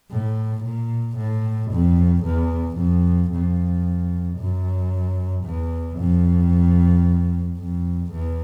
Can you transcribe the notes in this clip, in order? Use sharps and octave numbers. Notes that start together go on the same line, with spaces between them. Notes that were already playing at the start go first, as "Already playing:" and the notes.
A2
A#2
A2
F2
E2
F2
F2
F#2
E2
F2
F2
E2